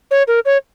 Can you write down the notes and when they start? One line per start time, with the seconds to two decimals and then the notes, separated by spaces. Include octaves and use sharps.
0.11 C#5
0.28 A#4
0.45 C#5